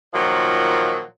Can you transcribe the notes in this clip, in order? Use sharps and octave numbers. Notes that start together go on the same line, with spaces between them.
A#2 D#3 F3 F#3